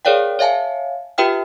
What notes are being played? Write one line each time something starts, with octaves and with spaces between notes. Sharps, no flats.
G#4 A#4 C#5 D5 F5 G5
C#5 E5 F5 G#5 A5
F4 G4 B4 E5 G5 F6